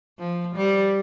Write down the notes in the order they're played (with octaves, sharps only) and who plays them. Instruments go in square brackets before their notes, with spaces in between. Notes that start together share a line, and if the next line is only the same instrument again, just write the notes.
[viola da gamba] F3
G3